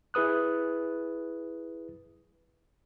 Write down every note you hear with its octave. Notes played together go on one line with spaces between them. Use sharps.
E4 G#4 B4 D#6 F#6